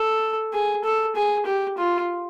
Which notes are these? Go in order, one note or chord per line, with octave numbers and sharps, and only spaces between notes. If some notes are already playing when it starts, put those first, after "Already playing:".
Already playing: A4
G#4
A4
G#4
G4
F4